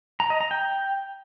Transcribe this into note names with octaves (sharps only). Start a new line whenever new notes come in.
A#5
D#5
A#5
G5